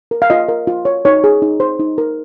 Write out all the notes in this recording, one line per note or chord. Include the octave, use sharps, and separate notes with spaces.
A#4
F5
F4 D#5
A#4
F4
C#5
D#4 C#5
G#4
D#4
C5
D#4
A#4